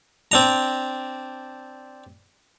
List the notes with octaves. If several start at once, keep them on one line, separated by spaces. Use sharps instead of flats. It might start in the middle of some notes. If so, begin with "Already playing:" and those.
C4 D4 A#5